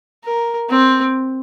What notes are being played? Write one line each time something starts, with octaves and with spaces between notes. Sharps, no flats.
A#4
C4